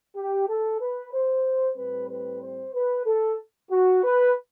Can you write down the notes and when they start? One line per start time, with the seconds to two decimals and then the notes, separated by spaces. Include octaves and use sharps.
0.15 G4
0.48 A4
0.79 B4
1.12 C5
1.76 A2 G3 C4 B4
2.08 B4
2.41 C5
2.73 B4
3.05 A4
3.70 F#4
4.02 B4